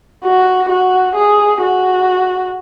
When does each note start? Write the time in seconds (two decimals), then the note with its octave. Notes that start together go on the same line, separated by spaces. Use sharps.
0.24 F#4
0.69 F#4
1.16 G#4
1.62 F#4